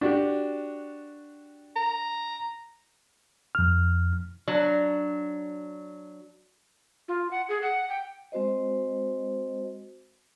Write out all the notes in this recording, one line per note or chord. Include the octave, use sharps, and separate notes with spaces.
D4 F#4 G4
A#5
F2 F6
F#3 D4
F4
F#5
G#4
F#5
G5
G#3 C4 F#4 C5 D#5